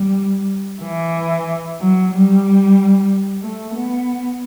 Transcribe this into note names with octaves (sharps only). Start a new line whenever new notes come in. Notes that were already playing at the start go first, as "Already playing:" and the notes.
Already playing: G3
E3
F#3
G3
A3
B3